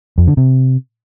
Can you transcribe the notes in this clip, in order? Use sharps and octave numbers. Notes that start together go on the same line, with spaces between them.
F2
D3
C3